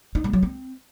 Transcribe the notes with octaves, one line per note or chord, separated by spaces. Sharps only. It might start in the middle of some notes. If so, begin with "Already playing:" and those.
D#4
G#3
F#3
C4